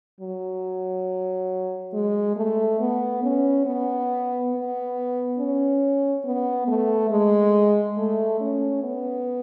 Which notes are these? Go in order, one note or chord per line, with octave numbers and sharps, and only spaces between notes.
F#3
G#3
A3
B3
C#4
B3
B3
C#4
B3
A3
G#3
A3
C#4
B3